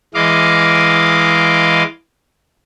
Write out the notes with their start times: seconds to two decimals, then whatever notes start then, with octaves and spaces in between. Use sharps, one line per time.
0.14 E3 G#3 D#5 F5 D6